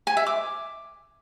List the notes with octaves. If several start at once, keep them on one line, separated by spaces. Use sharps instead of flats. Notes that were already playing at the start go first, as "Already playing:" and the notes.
G#5
E5
D6